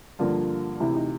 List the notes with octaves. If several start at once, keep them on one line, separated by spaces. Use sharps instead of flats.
G2 D3 F3 A#3 F4
D2 C3 E3 E4
D#4